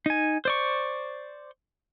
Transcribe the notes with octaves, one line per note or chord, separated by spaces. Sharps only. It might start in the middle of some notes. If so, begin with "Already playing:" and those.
D#4 G#5
C5 D5 C#6